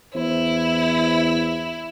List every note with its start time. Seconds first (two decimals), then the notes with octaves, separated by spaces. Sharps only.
0.15 E2 E4 C5